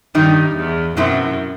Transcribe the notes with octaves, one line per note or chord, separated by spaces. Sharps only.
G2 D#3 G3 D#4
E2
F#2 B2 F#3 C4 E4